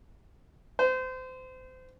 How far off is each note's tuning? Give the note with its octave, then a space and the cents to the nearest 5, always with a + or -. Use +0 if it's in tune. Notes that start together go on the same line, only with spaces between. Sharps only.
C5 -30